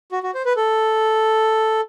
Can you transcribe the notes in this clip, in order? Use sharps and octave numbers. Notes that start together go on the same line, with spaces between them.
F#4
F#4
C5
B4
A4